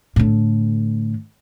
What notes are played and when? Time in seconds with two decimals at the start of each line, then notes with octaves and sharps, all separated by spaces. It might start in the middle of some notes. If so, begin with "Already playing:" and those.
0.16 A2 D3